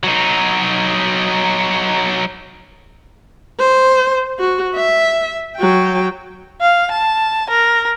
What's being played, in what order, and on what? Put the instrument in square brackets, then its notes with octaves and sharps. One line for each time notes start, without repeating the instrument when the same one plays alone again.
[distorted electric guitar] F#3 D#4
[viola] C5
F#4
E5
F#3 G5
[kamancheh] F5
A5
A#4